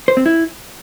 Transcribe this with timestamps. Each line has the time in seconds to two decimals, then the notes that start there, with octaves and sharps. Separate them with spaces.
0.08 C5
0.17 C4
0.26 E4